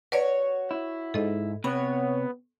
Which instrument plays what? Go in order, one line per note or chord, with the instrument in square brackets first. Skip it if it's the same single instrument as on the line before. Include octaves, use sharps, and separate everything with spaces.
[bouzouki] F#4 C#5 [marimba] B4 D5
[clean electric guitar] E4
[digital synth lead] G#2 [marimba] A4 D#5
[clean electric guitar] C3 [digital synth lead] B3 [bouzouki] C#5 [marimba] B5